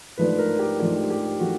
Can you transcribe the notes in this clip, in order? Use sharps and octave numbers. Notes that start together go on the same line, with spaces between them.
G#2 F3 A3 D4 B4
A#4
G4
G#2 F3 A3 D4 G4
G4
F3 A3 D4 F#4